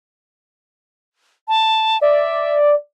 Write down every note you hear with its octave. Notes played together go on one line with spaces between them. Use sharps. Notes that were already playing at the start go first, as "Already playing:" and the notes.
A5
D5 E5